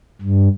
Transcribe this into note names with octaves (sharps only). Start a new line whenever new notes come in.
G2